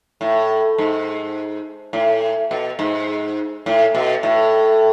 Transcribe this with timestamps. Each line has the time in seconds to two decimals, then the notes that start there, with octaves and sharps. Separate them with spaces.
0.21 A2
0.78 G#2
1.93 A2
2.51 B2
2.79 G#2
3.66 A2
3.95 B2
4.23 A2